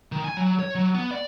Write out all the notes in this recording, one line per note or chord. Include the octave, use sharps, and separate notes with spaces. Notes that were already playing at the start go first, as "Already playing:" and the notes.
D#3
G#5
F#3
C#5
F#3
B3
D5